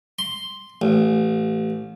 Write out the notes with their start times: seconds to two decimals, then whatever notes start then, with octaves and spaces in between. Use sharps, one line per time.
0.19 C6
0.82 A1